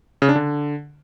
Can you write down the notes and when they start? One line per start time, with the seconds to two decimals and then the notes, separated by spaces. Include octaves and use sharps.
0.22 C#3
0.29 D4
0.36 D3